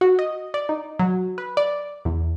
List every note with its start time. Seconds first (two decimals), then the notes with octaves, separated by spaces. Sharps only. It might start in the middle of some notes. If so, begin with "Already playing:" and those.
0.01 F#4
0.19 D#5
0.54 D5
0.69 D#4
0.99 F#3
1.38 B4
1.57 D5
2.05 E2